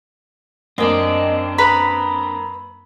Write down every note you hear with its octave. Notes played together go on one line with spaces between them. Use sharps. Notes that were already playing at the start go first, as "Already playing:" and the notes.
F#2 A#3 C4 D4 D#5 E6
B4 A#5 B5 D#6